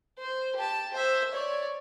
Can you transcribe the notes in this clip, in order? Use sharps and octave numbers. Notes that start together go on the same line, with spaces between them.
C5
G4 A5
C5 E5
C#5 D5